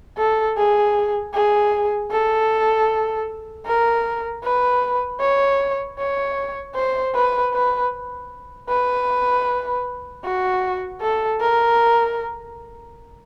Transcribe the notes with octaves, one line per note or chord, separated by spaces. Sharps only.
A4
G#4
G#4
A4
A#4
B4
C#5
C#5
C5
B4
B4
B4
F#4
A4
A#4